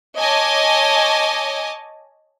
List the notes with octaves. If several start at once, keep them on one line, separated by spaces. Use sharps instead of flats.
C#5 D#5 G#5 A5 D6